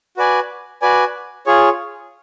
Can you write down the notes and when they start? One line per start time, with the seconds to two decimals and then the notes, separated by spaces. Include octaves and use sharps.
0.17 F#4 B4 D5 G#5
0.82 F#4 B4 D5 G#5
1.46 F4 G#4 C#5